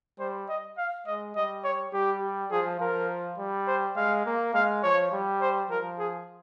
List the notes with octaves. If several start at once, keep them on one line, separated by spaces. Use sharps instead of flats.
G3 C5
D#5
F5
G#3 D#5
G3 D#5
C#5
G3 G4
F3 G#4
F3 A#4
G3
C5
G#3 F5
A#3
G#3 F5
F3 C#5
G3
C5
F3 A#4
G#4